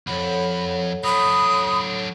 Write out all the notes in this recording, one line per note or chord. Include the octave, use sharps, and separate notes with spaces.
B1 F2 A4 C#5 F#5 B5
F#3 D4 B5 D#6